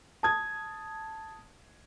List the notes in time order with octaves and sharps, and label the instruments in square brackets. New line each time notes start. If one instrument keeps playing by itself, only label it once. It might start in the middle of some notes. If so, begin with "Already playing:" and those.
[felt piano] A5 D#6 G#6